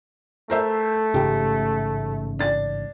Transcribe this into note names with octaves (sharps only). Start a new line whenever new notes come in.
A3 A#4 C5 E5
A1 G#2 C#3 G4
D4 A6